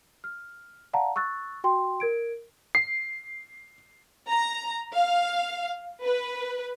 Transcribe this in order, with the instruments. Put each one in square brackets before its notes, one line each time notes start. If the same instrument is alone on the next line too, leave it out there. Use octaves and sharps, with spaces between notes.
[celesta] F6
D5 F5 F#5 A5 A#5
C#6 E6 F#6 A6
F#4 G5 C6
A#4 G#6 D7
[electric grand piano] C7
[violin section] A#5
F5
B4